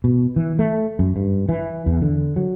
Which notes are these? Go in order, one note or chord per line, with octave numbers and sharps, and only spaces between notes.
B2
E3
A3
F#2
G2
E3
E2
D3
F#3